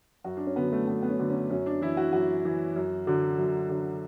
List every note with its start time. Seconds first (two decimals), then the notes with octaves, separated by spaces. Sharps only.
0.24 F#2 F#4
0.37 D4
0.47 C#4
0.56 D3 F#3 B3
0.72 A3
0.88 F#2 B3
1.03 B3
1.09 C#4
1.19 D3 F#3
1.30 C#4
1.50 F#2 C#4
1.66 D4
1.81 E3 E4
1.97 F#4
2.13 F#2 F#4
2.45 E3
2.76 F#2
3.07 D3 F#3
3.38 F#2
3.69 D3 F#3